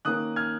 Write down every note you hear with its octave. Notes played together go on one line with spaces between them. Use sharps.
D#3 A#3 C#4 D#6 F#6
F6 G#6